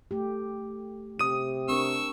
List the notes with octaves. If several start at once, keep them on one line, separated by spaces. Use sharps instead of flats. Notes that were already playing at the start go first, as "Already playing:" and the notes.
A3 G4
C3 G4 D#6 D#7
C4 D4 A#4 C#6 E6